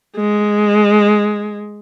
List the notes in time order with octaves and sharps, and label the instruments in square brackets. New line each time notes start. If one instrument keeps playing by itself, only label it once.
[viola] G#3